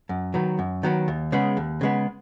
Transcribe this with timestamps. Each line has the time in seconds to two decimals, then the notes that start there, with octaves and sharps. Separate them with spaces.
0.09 F#2
0.34 D#3 F#3 B3
0.59 F#2
0.83 D#3 F#3 B3
1.08 D#2
1.32 C#3 G#3 B3
1.57 D#2
1.81 C#3 G#3 B3